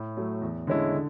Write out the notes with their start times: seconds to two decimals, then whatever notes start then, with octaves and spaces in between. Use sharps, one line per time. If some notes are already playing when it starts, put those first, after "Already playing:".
Already playing: A2
0.17 F#3 A3
0.42 E2
0.67 D3 G#3 C#4 E4
0.94 D3